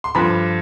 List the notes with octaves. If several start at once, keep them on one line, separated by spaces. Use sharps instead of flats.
C6
G2 D3 F3 B5